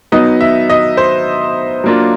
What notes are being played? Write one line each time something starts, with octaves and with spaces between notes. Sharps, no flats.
F#3 B3 D#4 D#5
E5
D#5
C5
F#3 A#3 D4 F4